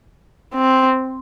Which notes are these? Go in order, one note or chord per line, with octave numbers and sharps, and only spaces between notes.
C4